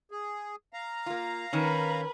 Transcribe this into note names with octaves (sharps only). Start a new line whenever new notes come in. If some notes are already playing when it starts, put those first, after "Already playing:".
G#4
F5 A#5
A#3 F4
D#3 C#4 A#4 B4 B5